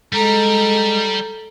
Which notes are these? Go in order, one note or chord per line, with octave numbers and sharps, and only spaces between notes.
G3 G#3 A4 A#5